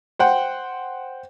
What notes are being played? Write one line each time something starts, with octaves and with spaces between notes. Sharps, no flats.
C5 F#5 G5